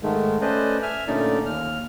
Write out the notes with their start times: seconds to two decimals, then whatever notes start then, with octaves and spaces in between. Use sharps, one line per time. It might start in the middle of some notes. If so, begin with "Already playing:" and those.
0.03 G#2 D#3 G#3 A3
0.41 A3 C#4 B4 C5 D5 D#5
0.82 E5 G#5 F6
1.07 A#2 D3 A3 C#4 D#4 D5
1.46 D#2 F6